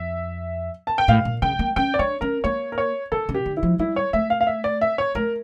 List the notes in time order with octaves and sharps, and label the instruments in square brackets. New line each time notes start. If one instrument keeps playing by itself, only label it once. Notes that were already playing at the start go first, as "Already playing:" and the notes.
Already playing: [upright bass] F2 [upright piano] E5
[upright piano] A5
G5
[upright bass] A2 [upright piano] F5
[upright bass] A#2
[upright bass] C#3 [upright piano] G5
[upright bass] A#3
[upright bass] C#4 [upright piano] G5
[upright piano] D5
[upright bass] D4 [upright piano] C#5
[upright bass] C#4 [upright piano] A#4
[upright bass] A#3 [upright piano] C#5
[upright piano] A#4
C#5
[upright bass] D3 [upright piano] A4
[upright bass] C#3
[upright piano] G4
[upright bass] D3
[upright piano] E4
[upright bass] F3
[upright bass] G3 [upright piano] E4
[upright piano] C#5
[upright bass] A3 [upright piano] E5
[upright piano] F5
F5
E5
D5
E5
C#5
[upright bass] A3 [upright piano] A#4